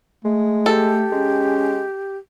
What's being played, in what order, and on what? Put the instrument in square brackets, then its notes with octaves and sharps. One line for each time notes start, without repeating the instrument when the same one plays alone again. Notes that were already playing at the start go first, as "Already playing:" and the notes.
[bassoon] G#3 [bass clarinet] A3
[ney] G4 [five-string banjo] A4
[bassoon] G#3 [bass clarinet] C#4